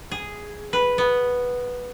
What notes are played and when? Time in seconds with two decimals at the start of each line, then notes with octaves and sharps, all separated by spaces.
0.12 G#4
0.73 B4
0.98 B3